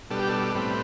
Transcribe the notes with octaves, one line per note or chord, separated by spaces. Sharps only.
B2 G3 D4 A4
G4
A4
A2 G3 C4 B4